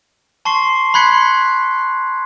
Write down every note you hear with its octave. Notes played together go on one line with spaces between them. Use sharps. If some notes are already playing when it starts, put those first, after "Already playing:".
A5 C6 C#6 C7
B5 C6 F#6 G#6 B6 C#7